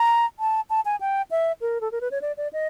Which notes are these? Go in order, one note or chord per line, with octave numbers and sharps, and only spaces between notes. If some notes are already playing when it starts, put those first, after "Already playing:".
Already playing: A#5
A5
A5
G#5
G5
E5
A#4
A4
A#4
B4
C#5
D5
D5
D#5